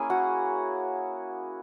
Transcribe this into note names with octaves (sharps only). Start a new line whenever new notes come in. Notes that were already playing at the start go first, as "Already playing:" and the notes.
Already playing: A#3 C#4 E4 G#4 G#5
F#4 F#5